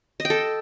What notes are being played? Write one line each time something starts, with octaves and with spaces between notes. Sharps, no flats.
D#5
G5
A4